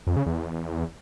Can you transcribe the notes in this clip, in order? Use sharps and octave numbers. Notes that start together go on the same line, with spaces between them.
F2
C#3
E2